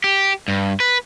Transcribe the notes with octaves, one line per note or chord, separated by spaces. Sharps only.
G4
G2
B4